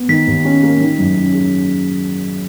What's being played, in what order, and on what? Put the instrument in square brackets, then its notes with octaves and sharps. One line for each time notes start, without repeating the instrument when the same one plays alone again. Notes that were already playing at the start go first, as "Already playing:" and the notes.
Already playing: [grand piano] B3
[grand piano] D#3 [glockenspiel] B6
[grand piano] D#2
C#4
A#3
D#3
F#2
C#4
G#3